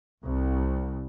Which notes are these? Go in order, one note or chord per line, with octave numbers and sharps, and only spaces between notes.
C2